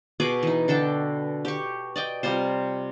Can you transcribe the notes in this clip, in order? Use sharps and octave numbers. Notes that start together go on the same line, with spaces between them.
B2 G#4 B4 D6
E3 D#4
D3 D4 A4 G5
G4 C#6
D5 D#5 G5
C3 G3 F4 C5